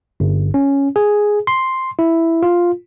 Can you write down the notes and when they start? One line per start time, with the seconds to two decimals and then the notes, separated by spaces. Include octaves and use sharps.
0.20 G1
0.54 C#4
0.96 G#4
1.47 C6
1.99 E4
2.43 F4